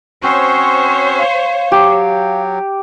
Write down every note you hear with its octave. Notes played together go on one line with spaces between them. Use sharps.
C4 C#4 F#4 C5 C#5
F5
F#3 G4